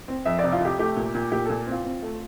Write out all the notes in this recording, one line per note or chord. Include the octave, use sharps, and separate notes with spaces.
C4
F2 E5
C3 D5
F4
C3 G4
A3 G4
A#2
A#2
A#2 G4
A#2 A4
C4
F4
C4
A3